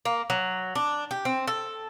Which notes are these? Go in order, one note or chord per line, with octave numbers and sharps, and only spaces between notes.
A#3
F#3
D4
G4
C4
A4